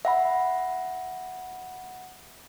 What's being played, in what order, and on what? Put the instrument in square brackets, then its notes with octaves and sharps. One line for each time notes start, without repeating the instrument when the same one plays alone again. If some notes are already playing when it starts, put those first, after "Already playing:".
[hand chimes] E5 F#5 B5